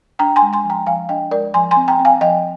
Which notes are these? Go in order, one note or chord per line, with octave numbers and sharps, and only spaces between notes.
D4 G5 A#5
G#5 C6
G#3
G#5 C6
F3
G5 A#5
F3 F5 G#5
D4 D#5 G5
G#3 A#4 D5
F3 G#5 C6
G#5 C6
C4
G5 A#5
C4
F5 G#5
F3 D#5 G5